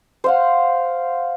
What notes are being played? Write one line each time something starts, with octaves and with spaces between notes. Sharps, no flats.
C5 F5 F#5